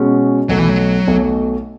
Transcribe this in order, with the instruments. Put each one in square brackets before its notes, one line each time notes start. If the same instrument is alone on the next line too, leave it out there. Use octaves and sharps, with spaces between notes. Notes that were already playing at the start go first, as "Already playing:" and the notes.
Already playing: [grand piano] B2 G#3 C#4 F#4
[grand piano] B1 B2 A3 [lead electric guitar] F#3
[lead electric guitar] E3
F#3
[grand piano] B1 B2 A3